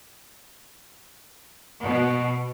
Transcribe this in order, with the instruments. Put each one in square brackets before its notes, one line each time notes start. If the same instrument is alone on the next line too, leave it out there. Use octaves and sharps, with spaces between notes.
[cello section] B2